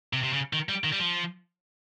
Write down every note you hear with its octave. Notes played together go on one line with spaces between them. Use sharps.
C3
C3
C#3
D#3
G3
D#3
G3
F3